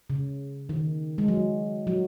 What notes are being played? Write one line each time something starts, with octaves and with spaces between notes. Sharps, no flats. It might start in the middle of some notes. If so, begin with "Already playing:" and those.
C#3
D#3
G#3
F#3
F#3